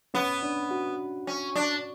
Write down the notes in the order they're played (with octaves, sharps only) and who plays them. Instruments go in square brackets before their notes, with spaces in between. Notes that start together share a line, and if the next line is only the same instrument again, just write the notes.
[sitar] B3 [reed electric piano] C#4
[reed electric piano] D4
F#4
[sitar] C#4
D4